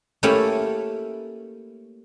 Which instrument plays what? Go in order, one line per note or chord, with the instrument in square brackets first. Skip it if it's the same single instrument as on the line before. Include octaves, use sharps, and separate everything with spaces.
[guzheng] A3 A#3 C#4 E4 G4 A4